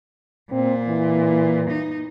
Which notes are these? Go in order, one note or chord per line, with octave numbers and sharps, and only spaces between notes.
A#2 C4
E3
D#4